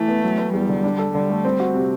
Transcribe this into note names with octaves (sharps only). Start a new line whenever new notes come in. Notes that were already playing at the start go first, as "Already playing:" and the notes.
Already playing: E3 A3
B3
F#3
B3
E2 G3
D3
D4
A4
D3 G3
A3
C4
F#4
C3